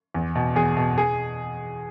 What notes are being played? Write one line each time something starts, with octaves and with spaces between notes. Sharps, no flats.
E2
B2
E2 G#4
B2
G#4